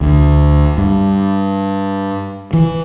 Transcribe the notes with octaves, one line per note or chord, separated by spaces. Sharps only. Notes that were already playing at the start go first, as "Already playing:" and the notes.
D2
G2
E3